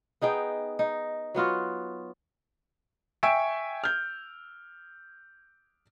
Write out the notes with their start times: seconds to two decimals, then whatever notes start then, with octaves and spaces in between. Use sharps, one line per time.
0.21 B3 D#4 G#4 G5
0.79 D#4
1.34 F#3 B3 F4 F#4
3.23 E5 G5 G#5 C#6 E6 D7
3.84 F6 G6